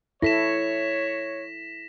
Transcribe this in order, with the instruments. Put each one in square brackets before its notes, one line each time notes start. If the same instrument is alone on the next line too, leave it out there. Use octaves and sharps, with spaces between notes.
[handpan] E4 A4 [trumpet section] C#5 [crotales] A#6 B6 E7